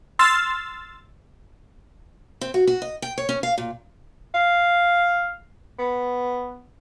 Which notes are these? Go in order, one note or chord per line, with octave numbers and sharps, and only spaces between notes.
C6 E6 F6 A6
C4
F#4
F#4
D#5
G5
C#5
C#4
F5
A#2
F5
B3